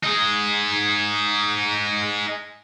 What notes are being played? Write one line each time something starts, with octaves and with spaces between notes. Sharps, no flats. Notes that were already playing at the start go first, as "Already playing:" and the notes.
D#4 G#4